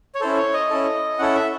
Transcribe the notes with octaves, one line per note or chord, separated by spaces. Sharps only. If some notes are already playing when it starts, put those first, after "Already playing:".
C#5
C#4 E4 A4 C5
C#5
D#5
C#4 E4 A4
C#4 E4 A4 F#5
E5